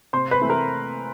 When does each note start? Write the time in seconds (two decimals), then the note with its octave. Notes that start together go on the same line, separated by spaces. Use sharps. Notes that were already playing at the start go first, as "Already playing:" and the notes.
0.13 C3 C5 C6
0.31 B4 B5
0.41 E3 A3 C4
0.50 A#4 A#5